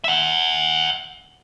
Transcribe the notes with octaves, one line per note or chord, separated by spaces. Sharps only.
E5 F#5